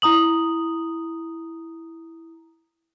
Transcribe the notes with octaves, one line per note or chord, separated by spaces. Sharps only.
E4 A#5 D#6 F#7